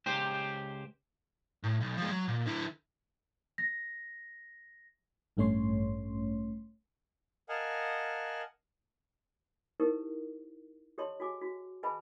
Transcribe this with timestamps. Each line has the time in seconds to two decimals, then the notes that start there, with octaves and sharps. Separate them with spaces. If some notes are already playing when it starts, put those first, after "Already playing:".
0.06 C#2 G4 C5
1.63 A2
1.81 B1
1.97 F3 G#3
2.11 F#3
2.28 A#2
2.46 D3 E4
3.58 A#6
5.37 A1 G2 A3 C#4 C#5 C6
7.49 A#4 D#5 F5 F#5 G#5 A5
9.80 D#4 E4 G4 A4 A#4 C5
10.98 G4 A4 C#5 D#5 A5 C6
11.20 F#4 G#4 G#5 D6
11.42 F#4
11.83 G#4 B4 D#5 G#5 A5 B5